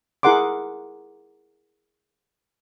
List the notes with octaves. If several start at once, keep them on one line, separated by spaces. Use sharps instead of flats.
E4 G#4 A#4 F#5 C6 D6